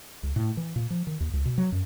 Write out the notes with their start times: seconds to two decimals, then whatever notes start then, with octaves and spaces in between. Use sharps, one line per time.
0.23 C#2
0.36 A2
0.57 E3
0.76 A#2
0.90 F3
1.07 D#3
1.20 D#2
1.33 C#2
1.45 B2
1.58 F#3
1.72 F#2